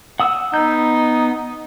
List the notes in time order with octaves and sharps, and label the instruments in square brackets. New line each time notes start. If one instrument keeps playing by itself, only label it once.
[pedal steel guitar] F#5 D#6 E6
[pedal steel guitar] B3 G6 [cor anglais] D#4